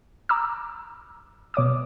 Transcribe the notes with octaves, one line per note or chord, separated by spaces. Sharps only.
A#5 D6 E6
B2 C#5 D6 D#6